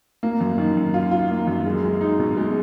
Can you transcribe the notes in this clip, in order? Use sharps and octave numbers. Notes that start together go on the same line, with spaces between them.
A#3
F#2
D#3
F#2
F4
F4
A#3
F#2
G#3
G#3
D#4
B2
G#3